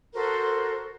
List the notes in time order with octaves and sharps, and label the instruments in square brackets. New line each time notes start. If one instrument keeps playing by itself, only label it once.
[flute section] F#4 A4 A#4 C5